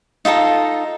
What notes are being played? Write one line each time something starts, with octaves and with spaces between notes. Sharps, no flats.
D#4 F4 A4 A#5